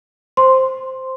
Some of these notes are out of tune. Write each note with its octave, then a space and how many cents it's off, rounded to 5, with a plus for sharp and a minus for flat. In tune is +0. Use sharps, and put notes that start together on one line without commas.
C5 +0 C6 +0